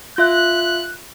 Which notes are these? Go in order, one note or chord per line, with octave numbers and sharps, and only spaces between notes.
F4 E5 F#6